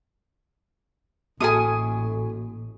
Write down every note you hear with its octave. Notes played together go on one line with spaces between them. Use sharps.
A1 A#3 F#4 A4 G#5 C#6 D#6